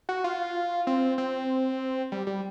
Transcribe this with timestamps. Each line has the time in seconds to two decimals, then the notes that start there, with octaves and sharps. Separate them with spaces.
0.09 F#4
0.24 F4
0.87 C4
1.18 C4
2.12 G3
2.27 G3